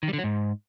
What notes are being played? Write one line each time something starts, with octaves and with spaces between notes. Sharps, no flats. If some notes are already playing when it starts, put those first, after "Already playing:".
D#3
G3
D3
F#3
G#2